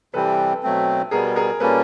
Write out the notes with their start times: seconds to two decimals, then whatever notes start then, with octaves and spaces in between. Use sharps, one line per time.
0.14 C3 E3 G3 C4 A4 B4
0.63 B2 F#3 A3 C4
1.11 B2 G3 B3 G#4 A#4
1.36 G#4 A#4
1.60 A#2 G3 A#3 C#4 A4 B4